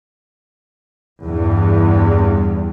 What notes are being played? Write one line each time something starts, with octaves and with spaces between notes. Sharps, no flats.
E2 G2